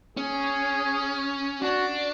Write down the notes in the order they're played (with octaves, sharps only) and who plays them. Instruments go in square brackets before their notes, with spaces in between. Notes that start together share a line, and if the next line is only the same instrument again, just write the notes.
[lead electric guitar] C#4 [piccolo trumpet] G#4
[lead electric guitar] D4 [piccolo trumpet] F#4